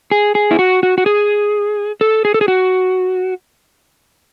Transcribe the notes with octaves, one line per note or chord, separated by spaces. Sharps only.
G#4
G#4
E4
F#4
F#4
F#4
G#4
A4
G#4
A4
G#4
F#4